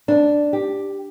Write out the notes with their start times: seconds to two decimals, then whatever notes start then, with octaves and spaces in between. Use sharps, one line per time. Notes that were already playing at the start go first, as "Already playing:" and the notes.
0.08 D4
0.53 G4